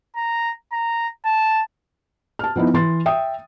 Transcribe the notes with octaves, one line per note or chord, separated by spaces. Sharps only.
A#5
A#5
A5
A5 F6
F3 B3 D#4 E4
E3 C6 A6
E5 G5 D#6